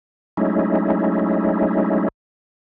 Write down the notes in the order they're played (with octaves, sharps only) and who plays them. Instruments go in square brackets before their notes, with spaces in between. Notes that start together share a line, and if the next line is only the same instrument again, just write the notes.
[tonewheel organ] F#3 G#3 A3 C#4 D#4 E4